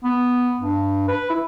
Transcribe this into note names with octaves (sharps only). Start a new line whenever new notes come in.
B3
G2
B4
E4